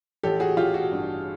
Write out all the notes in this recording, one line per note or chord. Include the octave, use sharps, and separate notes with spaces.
A1 G4 A4
F#4 G#4
A1 F4 G4
F#4
G2